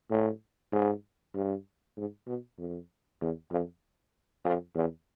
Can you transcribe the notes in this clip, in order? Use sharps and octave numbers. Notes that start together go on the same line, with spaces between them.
A2
G#2
G2
G#2
B2
F2
E2
F2
F2
E2